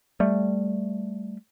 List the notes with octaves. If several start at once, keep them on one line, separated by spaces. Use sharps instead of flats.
G3 A3